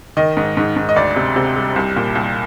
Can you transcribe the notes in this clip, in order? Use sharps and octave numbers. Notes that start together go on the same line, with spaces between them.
D#3 D#5
G#2
G#2
G#2
D#5
D2 D5
C3
C3
G3
C2
A#2
C2